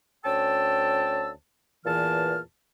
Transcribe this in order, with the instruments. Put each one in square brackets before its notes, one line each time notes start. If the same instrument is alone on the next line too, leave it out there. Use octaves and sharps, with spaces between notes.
[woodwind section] D2 C#4 G5 A5 E6
E2 A#2 E3 A5 F6